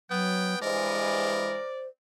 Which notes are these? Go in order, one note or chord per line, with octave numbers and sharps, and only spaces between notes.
F#3 B3 G5
G2 E3 G#3 A#4 C5 D5